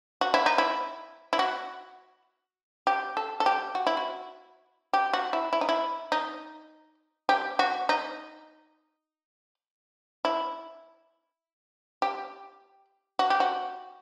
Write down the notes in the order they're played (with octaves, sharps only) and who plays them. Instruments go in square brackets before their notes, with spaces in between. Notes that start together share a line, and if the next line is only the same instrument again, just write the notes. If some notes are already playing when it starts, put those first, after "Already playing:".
[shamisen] F#4
E4
D#4
E4
E4
F#4
G4
A4
A4
G4
F#4
E4
F#4
G4
F#4
E4
E4
D#4
E4
D#4
G4
F#4
D#4
E4
G4
F#4
G4
F#4